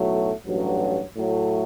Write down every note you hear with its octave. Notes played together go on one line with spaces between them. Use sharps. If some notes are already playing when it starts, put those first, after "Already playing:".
Already playing: B1 A2 F#3 A3
A1 G2 F#3
A2 F#3 A3